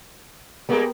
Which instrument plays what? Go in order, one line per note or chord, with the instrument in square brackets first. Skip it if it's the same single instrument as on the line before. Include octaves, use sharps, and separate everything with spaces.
[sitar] G3 G#3 A#3 [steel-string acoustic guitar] B3 G4 A#4